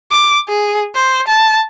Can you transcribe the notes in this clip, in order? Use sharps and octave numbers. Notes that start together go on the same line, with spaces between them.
D6
G#4
C5
A5